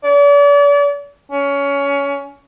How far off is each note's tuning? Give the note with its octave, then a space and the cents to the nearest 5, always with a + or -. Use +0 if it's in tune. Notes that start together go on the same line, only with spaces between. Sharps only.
D5 -40
C#4 +20